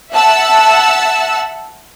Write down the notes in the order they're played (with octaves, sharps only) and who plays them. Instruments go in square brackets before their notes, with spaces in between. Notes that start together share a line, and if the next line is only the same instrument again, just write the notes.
[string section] E5 F#5 A5 E6